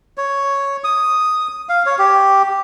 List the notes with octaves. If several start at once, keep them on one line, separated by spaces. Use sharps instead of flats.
C#5
D#6
F5
C#5
G4